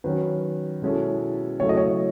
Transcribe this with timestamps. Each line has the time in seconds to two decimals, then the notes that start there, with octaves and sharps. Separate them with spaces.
0.04 D#3 F#3 C#4 F#4 B4
0.82 B2 G#3 C#4 E4 A4
1.60 C#3 F#3 A3 E4 A4 C#5
1.69 D#5
1.77 C#5